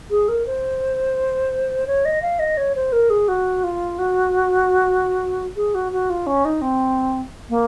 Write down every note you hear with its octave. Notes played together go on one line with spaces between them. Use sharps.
G#4
A#4
C5
C#5
D#5
F5
D#5
C#5
C5
A#4
G#4
F#4
F4
F#4
G#4
F#4
F#4
F4
C#4
D#4
C4
A#3